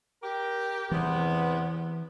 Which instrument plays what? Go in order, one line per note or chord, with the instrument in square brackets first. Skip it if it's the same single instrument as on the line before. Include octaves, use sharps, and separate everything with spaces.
[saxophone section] G4 A#4
[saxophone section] E2 C3 B3 [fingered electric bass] E3